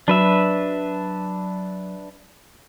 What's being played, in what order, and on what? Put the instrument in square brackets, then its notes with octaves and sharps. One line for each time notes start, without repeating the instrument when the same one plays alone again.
[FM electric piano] F#3 [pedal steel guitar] D4 B4 E5